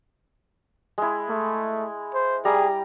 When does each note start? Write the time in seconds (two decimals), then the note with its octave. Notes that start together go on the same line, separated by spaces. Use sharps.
0.98 G#3 E4
1.29 A3
2.14 C5
2.45 G3 G#4 A#5